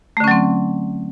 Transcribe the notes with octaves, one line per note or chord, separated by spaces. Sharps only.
D3 F#3 A3 C4 C#4